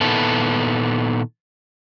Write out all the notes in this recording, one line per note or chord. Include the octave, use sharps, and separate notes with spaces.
A#2 D#3 B3 E4 A4